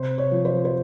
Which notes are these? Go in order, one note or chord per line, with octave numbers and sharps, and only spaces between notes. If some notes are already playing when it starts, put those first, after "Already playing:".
Already playing: C3 C5
C#5
F3
C5
C5